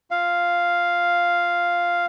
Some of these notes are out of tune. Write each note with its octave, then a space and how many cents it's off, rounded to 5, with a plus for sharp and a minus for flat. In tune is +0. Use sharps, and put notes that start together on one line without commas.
F4 +0 F5 +0